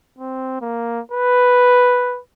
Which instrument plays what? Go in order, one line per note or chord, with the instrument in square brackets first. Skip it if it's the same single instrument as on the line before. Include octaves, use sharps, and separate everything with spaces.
[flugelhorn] C4
A#3
B4